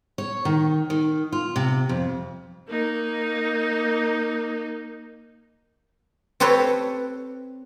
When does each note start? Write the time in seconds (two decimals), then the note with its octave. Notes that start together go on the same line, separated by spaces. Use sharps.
0.18 C#5
0.45 D#3
0.90 D#3
1.32 F4
1.56 C3
1.89 F2
2.68 A#3 D#4
6.40 C4 G4 A4 B4 C#5